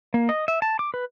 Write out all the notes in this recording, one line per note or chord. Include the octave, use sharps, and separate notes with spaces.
A#3
D#5
E5
A5
D6
B4